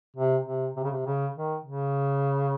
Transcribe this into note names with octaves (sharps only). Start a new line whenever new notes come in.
C3
C3
C3
C#3
C3
C#3
D#3
C#3